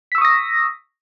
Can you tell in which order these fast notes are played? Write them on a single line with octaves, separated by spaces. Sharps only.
B6 E6 C#6 D#6 A#6